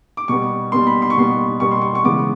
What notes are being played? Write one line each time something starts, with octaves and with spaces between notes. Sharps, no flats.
D6
B2 G3 B3 C#6
B2 G3 B3 C6
B5
C6
C#6
B2 G3 B3 C6
B2 G3 B3 C#6
C6
C#6
C#6
C#3 E3 G#3 B3 D6